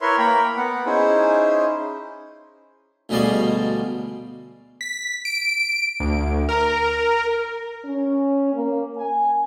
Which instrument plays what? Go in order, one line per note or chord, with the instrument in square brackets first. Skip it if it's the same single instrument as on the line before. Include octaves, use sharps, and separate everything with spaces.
[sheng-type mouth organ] E4 A#4 B4 C#5 E5 C6
A#3 A#4 G5 B5
B3 F#5
C#4 D#4 E4 G#4 C5
[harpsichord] D2 B2 G3 G#3 D5 F5
[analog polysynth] B6
D7
D2
A#4
[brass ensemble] C#4
A#3
G#5